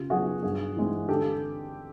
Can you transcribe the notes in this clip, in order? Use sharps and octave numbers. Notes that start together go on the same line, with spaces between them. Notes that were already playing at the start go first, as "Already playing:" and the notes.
Already playing: C#3 F4 G4
F#3 B3 D4 F4 F#4 G#4
G2 F#4 G#4
E3 G#3 C4
D3 G4 A4